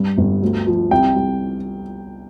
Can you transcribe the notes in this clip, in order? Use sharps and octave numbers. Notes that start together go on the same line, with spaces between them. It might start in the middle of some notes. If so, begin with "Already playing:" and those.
Already playing: G2 G3
G1
D2
F3
C2 G5
C2